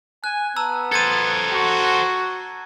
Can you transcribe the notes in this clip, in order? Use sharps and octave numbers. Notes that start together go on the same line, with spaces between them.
G#5 F#6
B3 A5 A#5 E6
A4 C5 G#6 A6 D#7
F#4